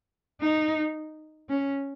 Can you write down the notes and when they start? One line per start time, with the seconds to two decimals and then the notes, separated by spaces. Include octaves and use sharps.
0.41 D#4
1.49 C#4